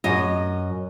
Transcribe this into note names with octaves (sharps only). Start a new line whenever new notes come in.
F#2 D#5